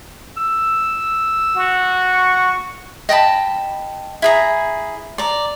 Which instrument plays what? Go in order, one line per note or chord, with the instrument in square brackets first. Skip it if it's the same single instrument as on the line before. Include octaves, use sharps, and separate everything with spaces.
[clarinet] E6
[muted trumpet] F#4
[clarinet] C#6
[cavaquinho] D#5 G5 A5 B5
E4 G#4 A#5
D5 A#5